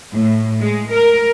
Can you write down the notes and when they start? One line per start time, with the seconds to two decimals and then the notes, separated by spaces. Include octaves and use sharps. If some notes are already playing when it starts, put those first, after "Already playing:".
0.13 A2
0.60 G#3
0.92 A#4